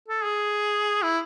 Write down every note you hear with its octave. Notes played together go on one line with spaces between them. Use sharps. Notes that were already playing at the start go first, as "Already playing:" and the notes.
A4
G#4
E4